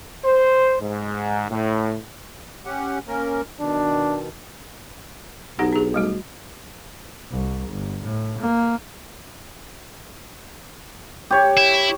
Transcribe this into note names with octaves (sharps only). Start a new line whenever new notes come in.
C5
G#2
A2
C#4 G4 F#5
A#3 C#4 A#4
B2 D#3 D4
B1 D#4 G4 F#5
D4 G#4
G3 A3 F#4
C2
G1
A2
A#3
G4 C#5
E4